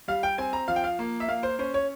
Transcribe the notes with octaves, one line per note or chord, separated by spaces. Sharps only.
G3 F5
G5
C4 G#5
A#5
F3 F5
G5
F5
A#3
E5
A#3 F5
C5
C#4 C5
C#5